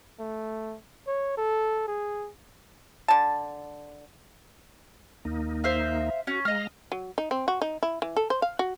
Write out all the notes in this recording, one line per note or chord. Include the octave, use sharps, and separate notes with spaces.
A3
C#5
A4
G#4
D3 A5
D#2 A#3 D#4
C5 E5 F5
C#4 F#4
G#3 D#5 F5 A#5 F6
F#3
D#4
C4
F#4
D#4
E4
E3
A4
C5
F5
F#4